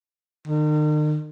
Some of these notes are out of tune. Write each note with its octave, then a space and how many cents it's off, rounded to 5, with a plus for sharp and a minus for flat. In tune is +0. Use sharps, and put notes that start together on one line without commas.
D#3 -45